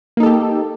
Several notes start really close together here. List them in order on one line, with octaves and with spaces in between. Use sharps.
A#3 D#4 A4 G4